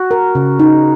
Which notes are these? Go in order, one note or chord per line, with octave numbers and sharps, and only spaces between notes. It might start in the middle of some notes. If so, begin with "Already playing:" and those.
Already playing: F#4
A#4
C#3
D#4